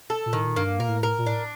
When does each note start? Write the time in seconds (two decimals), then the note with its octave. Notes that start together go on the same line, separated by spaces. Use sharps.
0.10 A4
0.26 A#2
0.33 A2 D#3
0.45 A#2
0.56 G2 A#3
0.79 A#2 A#4
0.88 A2
1.03 A#4
1.18 A#2
1.26 A2 D4